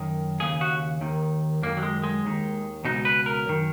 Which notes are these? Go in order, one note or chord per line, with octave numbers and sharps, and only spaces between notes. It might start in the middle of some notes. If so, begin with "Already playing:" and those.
Already playing: F#2 D#3
D#2 C#3 G#4
F#4
D#2 D#3
F#2 D#3 A#3
F#3
G#3
G#3
D#2 D#3
C#2 B2 D#4
B4
A#4
F#2 D#3